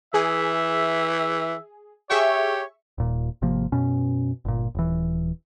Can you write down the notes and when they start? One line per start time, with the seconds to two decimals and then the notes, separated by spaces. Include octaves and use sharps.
0.14 E3 G#4 E5
2.10 G4 G#4 C#5 E5 C#6
2.98 D#1 A#2
3.42 G#1 C3 F3 A#3
3.72 F#2 B2 C#4
4.45 G1 A#2
4.75 D#1 E3